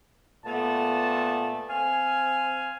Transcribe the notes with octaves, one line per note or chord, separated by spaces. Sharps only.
A#2 A3 B3 A5
C4 F5 G#5